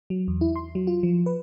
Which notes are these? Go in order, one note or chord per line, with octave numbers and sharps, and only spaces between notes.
F#3
E2
E4
C6
F#3
F4
F3
B4